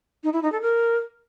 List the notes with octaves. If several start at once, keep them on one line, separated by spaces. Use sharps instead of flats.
D#4
E4
D#4
A4
A#4